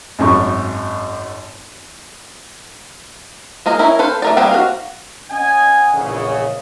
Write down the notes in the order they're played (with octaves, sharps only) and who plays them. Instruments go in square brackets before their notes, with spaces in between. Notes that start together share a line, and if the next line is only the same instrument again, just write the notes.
[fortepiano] G#1 F#2 C#6
[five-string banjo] G#3 A#3 A#4 D#5
C#4 E4 A#4
A4 B4 C5 F5
A3 A#4 D5
G3 A#3 C4 G4 G#4
F#4 F5
[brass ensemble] C#4 D#5 F#5 G#5
A#1 E2 C#3